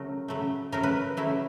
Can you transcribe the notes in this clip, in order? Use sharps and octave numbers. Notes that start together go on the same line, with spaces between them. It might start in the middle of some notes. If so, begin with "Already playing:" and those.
Already playing: C#3 F#3 A3 A#4
C#3 F#3 A3
C#3 F#3 A3 A#4
B4
C#3 F#3 A3 E4